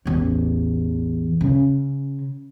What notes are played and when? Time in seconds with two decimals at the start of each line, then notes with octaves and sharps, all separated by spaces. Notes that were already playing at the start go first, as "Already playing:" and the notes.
0.05 A1 E2
1.41 C#3